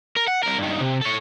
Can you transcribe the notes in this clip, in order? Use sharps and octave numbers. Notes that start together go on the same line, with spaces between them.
A#4
F#5
C2 A#4
G2 D#3
C3
A4 C#5